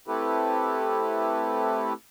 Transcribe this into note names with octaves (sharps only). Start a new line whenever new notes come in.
A3 C4 E4 G4 A4 B4